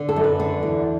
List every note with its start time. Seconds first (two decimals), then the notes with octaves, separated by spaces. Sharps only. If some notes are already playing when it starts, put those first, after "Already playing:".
Already playing: D3
0.09 A4
0.16 F#2
0.24 B4
0.40 D3
0.63 E2